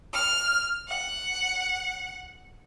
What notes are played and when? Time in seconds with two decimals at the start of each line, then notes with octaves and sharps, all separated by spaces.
0.14 F6
0.87 F#5